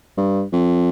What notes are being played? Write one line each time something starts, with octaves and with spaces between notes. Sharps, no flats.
G2
F2